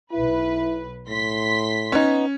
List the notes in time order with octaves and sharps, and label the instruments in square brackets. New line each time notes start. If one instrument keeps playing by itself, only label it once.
[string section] B1 B4 [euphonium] E4
[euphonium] A2 [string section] C6 B6
[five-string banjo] B3 D#4 [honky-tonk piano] C#4